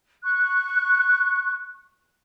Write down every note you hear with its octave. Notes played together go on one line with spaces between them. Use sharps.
C#6 F#6